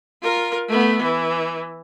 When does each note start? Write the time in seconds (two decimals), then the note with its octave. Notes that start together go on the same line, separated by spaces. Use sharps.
0.23 F4 A#4
0.68 A3 B3
1.02 E3